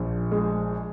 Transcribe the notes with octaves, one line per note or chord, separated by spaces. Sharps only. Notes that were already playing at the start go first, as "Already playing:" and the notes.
Already playing: A#1 A#2
G#3